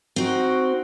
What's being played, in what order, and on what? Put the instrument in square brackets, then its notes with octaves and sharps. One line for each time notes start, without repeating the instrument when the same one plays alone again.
[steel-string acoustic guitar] C4 D#4 [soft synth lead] F#4